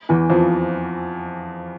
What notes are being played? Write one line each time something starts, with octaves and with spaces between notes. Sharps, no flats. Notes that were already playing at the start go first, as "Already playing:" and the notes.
E2 E3
F2 F3